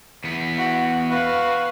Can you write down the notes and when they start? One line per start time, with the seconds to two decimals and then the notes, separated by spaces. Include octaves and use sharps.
0.24 E2 B3
0.57 F#4
1.10 F#4 B4 F5